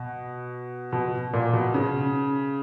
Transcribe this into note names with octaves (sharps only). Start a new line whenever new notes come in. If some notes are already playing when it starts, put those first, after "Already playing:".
Already playing: B2
B2
A#2
B2
C#3